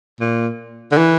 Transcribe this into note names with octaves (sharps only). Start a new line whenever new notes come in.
A#2
D3
E3